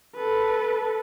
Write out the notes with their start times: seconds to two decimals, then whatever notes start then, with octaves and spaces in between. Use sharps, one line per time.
0.16 A4 B4